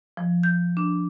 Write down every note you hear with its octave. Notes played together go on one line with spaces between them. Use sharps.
F3
G6
D4